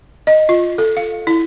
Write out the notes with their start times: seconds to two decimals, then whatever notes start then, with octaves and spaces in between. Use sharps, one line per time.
0.27 D#5
0.49 F4
0.78 A4
0.97 F5
1.27 E4